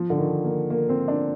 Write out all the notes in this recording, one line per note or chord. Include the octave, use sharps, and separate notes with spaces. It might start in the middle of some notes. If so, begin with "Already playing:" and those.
Already playing: F3
D3
D#3
A#3
A#3
C4
D4